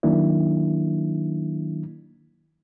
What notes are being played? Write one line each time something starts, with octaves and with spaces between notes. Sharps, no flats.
D#3 F#3 A#3 D4 E4